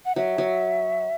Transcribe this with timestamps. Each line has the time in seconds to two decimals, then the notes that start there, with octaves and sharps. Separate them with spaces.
0.06 F#5
0.16 F#3 E5
0.38 F#3